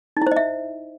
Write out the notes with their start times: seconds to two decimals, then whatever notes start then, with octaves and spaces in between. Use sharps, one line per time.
0.17 D#4
0.22 E4
0.27 C5
0.31 D#5
0.36 E5